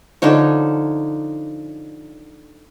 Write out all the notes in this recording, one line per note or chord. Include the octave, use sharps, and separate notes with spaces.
D3 F3 D#4 C#5